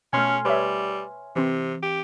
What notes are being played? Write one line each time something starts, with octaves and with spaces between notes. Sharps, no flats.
B2 A3 C#4 G#5 C6 F6
G3 B4 C#5 E5
C3 E3 C4
G4